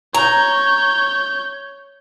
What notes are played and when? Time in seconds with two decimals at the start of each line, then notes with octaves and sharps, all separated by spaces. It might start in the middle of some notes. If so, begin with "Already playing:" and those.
0.15 C#5 A#5 G6